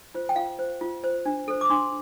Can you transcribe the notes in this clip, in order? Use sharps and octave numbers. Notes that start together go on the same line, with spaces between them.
F4 C5
G5
F4 F5
C5
F4
C5
D4
A4 C5
D6
D4 C6